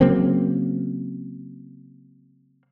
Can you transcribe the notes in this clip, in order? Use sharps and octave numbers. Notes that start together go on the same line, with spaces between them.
C#3 F#3 A#3 C4